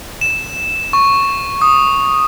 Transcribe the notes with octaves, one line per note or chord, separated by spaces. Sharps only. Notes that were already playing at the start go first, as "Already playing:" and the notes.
E7
C#6
D#6